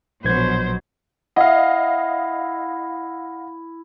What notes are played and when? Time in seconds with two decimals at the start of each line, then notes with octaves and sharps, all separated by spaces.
0.25 A#1 B2 F#3 C5 G#6
1.36 E4 D#5 F5 F#5